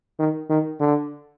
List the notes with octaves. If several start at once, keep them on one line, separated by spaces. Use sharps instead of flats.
D#3
D#3
D3